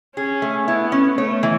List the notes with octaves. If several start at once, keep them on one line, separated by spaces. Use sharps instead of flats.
C#4 G#4
A3
B3 E4
C#4
A3 C#5
E3